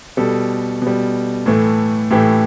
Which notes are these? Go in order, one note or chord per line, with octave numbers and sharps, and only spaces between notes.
B2 G3 A4
B2 G3
A2 E3 A3
A2 E3 A3 G4